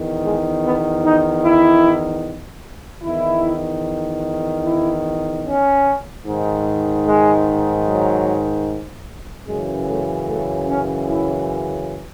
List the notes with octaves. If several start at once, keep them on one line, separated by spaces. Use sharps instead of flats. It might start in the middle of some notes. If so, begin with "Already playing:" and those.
Already playing: E2 D#3
G#3
B3
D#4
E4
E2 D#3 E4
E4
C#4
G#2 D#3
G#3
F#3
F#2 C#3 E3 G#3
A3
A3
C#4
E4